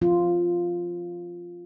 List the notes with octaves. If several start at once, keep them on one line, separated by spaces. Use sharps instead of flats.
F3 C4 F4